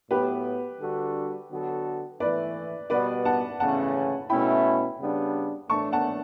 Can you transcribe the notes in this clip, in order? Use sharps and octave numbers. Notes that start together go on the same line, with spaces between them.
A2 F#3 B3 G4 B4
D3 G3 D4 F#4 A4
D3 F#3 B3 F#4 A4
E3 A3 E4 B4 D5
B2 G3 B3 B4 D5
F#5 A5
C#3 E3 A3 C#4 F#5 A5
B2 A3 C#4 E4 G5 B5
C#3 G3 B3 D4
A2 E3 A3 D4 A5 C#6
F#5 A5